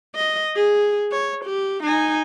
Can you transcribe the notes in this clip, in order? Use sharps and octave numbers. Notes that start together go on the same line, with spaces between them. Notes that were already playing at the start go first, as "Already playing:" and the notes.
D#5
G#4
C#5
G4
D#4 G#5